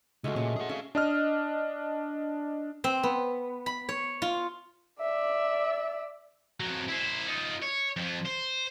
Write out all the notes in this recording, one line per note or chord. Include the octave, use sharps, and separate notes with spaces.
C#2 G#3 A3 F#4
A#2 C#4
G#4 F#5
C#4 E5 F5
D4 D#5 F6
C4
B3
B5
C#5
F4
D5 E5
F2 F#3
E4 C5
D#4 F4
C#5
F2 F3
C5